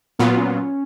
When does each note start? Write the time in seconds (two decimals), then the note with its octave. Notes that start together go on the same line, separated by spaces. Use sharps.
0.19 A#2 F#3 A#3 B3 F4
0.37 C#4
0.55 C#4